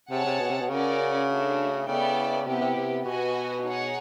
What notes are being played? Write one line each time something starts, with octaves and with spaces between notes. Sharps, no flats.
C3 G#4 C#5 F#5 A5
C3
B2
C3
B2
C#3 C#4 F#4 A#4 D5
A3 D4 F#4
C#3 B3 E4 A4 D5 G5
C3 B3 E4 G4
C3
C3
B2 F#4 B4 D#5 G#5
D#4 G#4 C#5 F#5